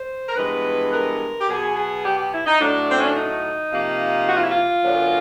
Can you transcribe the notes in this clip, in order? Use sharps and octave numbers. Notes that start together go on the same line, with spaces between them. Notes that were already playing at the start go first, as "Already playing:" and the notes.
Already playing: C5
A#4
G2 E3 G#3 B3 B4
A#4
G4
B2 F#3 B3 G#4
G#4
G4
G4
E4
D#4
A2 F#3 A3 D4
C4
C#4
D4
D#4
C3 F3 A#3
F#4
F4
E4
F4
F#2 D3 F#3 B3